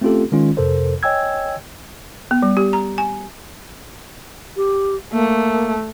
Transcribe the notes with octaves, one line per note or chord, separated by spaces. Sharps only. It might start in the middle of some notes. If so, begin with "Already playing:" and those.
A3 C4 C#4 F4 G4 A4
D#3 G#3 C#4 F4
F2 C3 A4 A#4 C5
C#5 D#5 G5 G#5 E6 G#6
B3
G3
G4
A#5
G#5
G4
A3 A#3